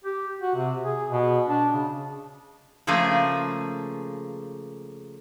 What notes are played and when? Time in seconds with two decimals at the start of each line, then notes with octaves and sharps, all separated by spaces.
0.05 G4
0.41 F#4
0.55 C3
0.84 G#4
1.11 B2
1.49 D4
1.73 C#3
2.87 C#3 F3 A3 A#3 G#4